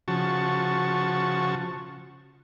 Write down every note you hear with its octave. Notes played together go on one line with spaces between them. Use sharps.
C#3 F3 F#4 A5 C#6